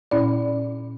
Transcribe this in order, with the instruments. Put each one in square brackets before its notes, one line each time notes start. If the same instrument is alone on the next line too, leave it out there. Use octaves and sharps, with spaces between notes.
[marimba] A#2 C#4 E4 D5